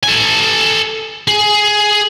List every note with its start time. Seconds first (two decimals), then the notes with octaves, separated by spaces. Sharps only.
0.03 A4 G#5
1.28 G#4